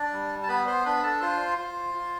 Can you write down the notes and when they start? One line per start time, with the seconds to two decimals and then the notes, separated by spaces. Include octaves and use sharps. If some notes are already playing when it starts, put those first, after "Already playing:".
Already playing: D4 D5
0.13 G3
0.43 A5
0.49 B3 B4 B5
0.67 C5 C6
0.85 D4 B4 B5
1.03 A4 A5
1.21 F4 C5 C6
1.58 F4 C5 C6
1.94 F4